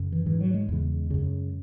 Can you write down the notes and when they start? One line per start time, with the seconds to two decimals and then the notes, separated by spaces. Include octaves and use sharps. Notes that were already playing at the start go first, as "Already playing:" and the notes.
Already playing: F#2 C#3
0.12 E3
0.26 G#2 E3
0.40 F#3
0.54 G#3
0.68 E2 C#3
1.10 F#2 C#3